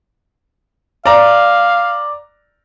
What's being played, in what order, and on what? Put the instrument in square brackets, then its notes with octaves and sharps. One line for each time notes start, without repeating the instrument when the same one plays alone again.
[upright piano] D5 A#5 [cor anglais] F5